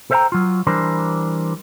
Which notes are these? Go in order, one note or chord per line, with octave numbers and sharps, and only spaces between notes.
A4 C5 E5 F5 G5 A#5
F#3 F4
E3 G3 D4 A#4 C5